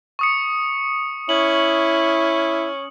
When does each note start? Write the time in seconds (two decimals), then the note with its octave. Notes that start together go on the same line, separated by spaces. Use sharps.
0.19 C#6 D#6 C#7
1.29 C#4 E4 F#7